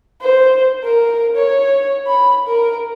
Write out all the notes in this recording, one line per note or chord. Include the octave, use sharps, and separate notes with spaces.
C5
A#4
C#5
B5
A#4